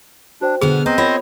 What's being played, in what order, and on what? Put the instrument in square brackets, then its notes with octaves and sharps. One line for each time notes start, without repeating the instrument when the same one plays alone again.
[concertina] D4 [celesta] F#4 C5 G5
[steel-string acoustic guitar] B2 D3 B3 [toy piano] G#4 [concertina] F6
[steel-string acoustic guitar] B3 [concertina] C4 C5 D#5 [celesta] A#5
[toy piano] F4 [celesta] A#4 [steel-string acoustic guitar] C#5 F#5